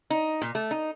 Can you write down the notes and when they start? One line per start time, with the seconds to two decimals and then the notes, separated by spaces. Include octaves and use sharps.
0.10 D#4
0.42 A#2
0.55 A3
0.71 D#4